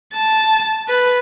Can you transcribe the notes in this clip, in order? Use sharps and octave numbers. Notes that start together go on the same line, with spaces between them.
A5
B4